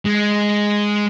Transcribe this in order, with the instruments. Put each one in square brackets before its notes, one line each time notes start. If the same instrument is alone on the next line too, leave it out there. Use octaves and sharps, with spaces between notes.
[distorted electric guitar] G#3